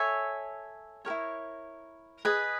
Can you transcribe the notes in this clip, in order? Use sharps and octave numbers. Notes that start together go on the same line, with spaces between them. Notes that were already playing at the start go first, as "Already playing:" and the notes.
Already playing: A4 C#5 E5 G#5
G4 A#4 C#5
E4
G#4 B4 D#5